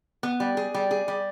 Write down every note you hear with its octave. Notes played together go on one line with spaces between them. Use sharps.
B3
G3
G#4
G3
G#4
G3